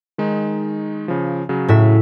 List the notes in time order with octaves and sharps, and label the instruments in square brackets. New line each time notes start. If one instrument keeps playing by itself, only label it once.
[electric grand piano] D#3 G#3 D#4
C#3 F3
C#3 F#3
[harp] A2 E5